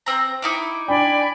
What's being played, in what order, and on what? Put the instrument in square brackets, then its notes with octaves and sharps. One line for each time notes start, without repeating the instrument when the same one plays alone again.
[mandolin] C4 A#5
D#4 E4 D6
[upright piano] D4 G5 [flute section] D5 G#5 B5